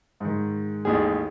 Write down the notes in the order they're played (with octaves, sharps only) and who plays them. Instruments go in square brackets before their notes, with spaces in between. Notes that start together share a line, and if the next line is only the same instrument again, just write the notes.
[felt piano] G#2 D#3
[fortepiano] A1 D#2 G#4